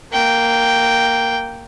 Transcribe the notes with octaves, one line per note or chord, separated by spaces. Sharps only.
A#3 G5